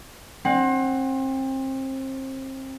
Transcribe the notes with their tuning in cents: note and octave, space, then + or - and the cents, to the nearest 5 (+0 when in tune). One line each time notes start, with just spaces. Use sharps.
C4 +30 F#5 +15